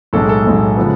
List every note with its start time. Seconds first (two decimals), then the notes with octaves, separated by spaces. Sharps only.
0.13 B1 A2 G#3 A4
0.29 A4
0.45 B1 A2 G#3
0.76 C#3 F3 G#3 B3